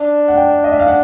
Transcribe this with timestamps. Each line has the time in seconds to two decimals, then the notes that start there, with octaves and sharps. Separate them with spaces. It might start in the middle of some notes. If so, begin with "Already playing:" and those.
Already playing: D4
0.28 F#5
0.37 G5
0.64 D#5
0.72 E5
0.79 F5
0.88 F#5